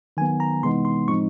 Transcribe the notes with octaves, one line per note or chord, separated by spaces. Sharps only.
D#3 F#3 B3 G#5
A#5
C3 E3 G#3 B3 D#4 C6
C6
A2 F3 G#3 C4 D#4 C#6